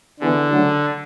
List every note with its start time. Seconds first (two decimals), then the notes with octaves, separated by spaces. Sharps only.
0.20 D3 E3 B3 E4 G#4
0.51 C#3 F#3 A3 D4 F#4